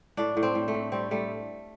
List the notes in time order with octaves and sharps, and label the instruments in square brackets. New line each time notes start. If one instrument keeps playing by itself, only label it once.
[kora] A2 D4
A2
C4
A2
A3
A2
G3 C4
G3 A3